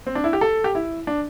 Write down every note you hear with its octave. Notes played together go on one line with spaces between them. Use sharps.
C4
D4
E4
G4
A4
G4
E4
D4